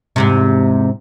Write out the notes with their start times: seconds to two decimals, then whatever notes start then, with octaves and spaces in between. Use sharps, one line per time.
0.16 E2 G#2 C3